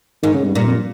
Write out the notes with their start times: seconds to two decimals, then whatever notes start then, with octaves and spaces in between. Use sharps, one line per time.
0.23 G#2 D#3
0.34 C#3
0.44 G2
0.55 G2 A#2
0.66 F2